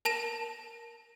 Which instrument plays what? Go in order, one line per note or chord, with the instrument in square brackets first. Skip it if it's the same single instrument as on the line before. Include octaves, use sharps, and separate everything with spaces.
[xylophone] A#4 A5 A#6 E7